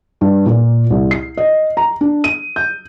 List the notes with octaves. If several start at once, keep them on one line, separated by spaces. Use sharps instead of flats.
G2
A#2
C2
C7
D#5
A#5
D4
D#7
G6